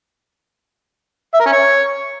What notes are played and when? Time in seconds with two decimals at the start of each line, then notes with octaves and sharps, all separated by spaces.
1.34 E5
1.40 A#4
1.46 C#4
1.52 C#5